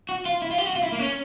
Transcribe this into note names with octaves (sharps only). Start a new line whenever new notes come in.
F#4
F4
E4
F4
G4
F#4
F4
E4
A#3
C#4